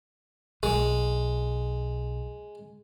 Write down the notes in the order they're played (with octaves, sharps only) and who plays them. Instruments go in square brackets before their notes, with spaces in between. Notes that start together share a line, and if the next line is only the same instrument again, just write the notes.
[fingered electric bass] B1 [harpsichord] G#3